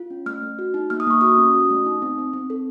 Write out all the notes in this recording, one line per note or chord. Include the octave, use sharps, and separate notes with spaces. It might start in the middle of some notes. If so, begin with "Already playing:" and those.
Already playing: F4
C#4
A3 F6
A3
F#4
D#4
A#3 F6
D#6
A#3 C#6
F#4 D#6
C#4
F#4
A3
D#4
C4
C4
C4
A4